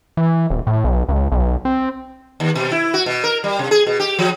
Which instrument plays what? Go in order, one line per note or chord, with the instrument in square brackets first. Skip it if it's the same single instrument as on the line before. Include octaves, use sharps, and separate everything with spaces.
[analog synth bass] E3
D#1
A2
B1
C#2
B1
C4
[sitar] D#2
B2
E4
F#4
B2
A#4
G3
C3
G#4
B2
G4
F3